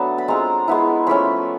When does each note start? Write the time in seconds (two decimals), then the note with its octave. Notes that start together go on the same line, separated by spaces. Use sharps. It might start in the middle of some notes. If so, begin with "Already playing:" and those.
Already playing: F#3 A3 B3 D4 A5
0.18 B5
0.28 G#3 C4 F4 A#5
0.68 G#3 B3 E4
1.07 F3 A3 C#4 B5